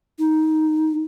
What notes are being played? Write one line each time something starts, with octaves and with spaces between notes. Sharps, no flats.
D#4